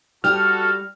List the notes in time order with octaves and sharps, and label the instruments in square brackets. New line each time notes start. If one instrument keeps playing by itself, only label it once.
[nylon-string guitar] G3 G4 [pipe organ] F#4 A4 [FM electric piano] F6